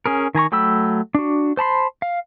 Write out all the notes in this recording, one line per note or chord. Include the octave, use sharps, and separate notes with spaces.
C#4 G#4 A#4
D#3 G#5 A#5 C#6
F#3 A3 G5 B5 E6
D4 F#4
C5 A5 B5 C6
F5